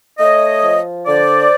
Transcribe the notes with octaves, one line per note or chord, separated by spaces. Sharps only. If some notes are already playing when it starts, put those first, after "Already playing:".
A3 C#5 D#5
F3
D3 C5 D5